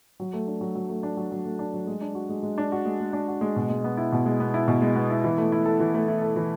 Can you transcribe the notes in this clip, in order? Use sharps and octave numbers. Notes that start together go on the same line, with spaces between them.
F#3
A3
D4
F#3
F#3
A3
D4
F#3
F#3
A3
D4
F#3
G#3
D4
F#4
G#3
G#3
D4
F#4
G#3
G#3
D4
F#4
G#3
B2
G#3
B3
E4
B2
G#3
B3
E4
B2
G#3
B3
E4
E3
A3
E4
A4
E3
A3
E4
A4
E3